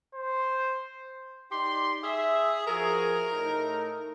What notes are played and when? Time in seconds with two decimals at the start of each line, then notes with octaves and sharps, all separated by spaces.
0.14 C5
1.51 D#4 G4 D5 C6
2.03 G#4 E5
2.67 F3 F#4 G#4 A#4
3.31 A2 A3 D#4